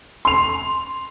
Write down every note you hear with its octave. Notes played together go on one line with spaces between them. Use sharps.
C6 F7